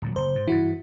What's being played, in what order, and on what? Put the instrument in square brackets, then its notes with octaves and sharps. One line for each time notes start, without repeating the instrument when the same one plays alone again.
[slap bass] D1 A#2 F#3
[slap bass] F#1 [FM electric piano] C5
[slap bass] G#2
[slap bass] G2 E3 [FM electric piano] E4 F#4